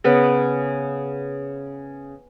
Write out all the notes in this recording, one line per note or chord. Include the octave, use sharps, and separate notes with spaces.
C#3 B3 B4